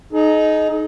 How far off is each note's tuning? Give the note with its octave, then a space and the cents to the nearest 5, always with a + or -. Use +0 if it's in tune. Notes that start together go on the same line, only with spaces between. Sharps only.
D#4 +0 G#4 +45